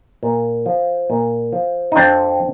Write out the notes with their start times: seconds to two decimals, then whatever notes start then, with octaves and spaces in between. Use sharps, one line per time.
0.23 A#2
0.66 F3
1.10 A#2
1.53 F3
1.92 D#4
1.96 F2 C4 D4